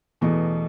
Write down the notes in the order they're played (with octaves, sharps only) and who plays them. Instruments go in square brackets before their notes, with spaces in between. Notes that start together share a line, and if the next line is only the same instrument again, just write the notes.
[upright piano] E2 B2 A3 [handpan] E3